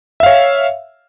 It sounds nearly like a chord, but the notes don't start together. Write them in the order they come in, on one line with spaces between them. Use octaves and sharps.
E5 F5 C#5